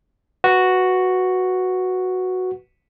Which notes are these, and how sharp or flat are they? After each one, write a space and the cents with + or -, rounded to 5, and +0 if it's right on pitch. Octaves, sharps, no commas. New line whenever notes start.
F#4 +0 B4 +0